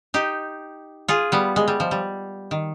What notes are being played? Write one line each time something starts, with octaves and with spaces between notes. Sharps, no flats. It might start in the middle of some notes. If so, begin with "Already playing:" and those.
D#4 G4
F4 G#4
G3 B3
G#3
G3
F3
G3
D#3